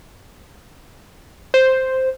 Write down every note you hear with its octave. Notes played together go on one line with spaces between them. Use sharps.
C5